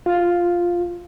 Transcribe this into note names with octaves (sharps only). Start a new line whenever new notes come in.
F4